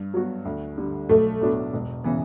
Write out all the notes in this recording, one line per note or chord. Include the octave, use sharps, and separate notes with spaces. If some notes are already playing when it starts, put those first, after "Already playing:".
Already playing: G2
F#3 B3 F#4
D2
D3 G3
B1 A3
A2 F#3 B3 D4
E1
C#3 E3 B3